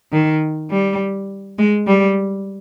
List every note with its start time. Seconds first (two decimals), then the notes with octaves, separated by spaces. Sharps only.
0.12 D#3
0.71 G3
1.58 G#3
1.87 G3